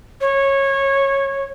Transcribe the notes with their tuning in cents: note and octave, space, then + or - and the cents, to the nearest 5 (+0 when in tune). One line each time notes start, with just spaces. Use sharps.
C#5 -15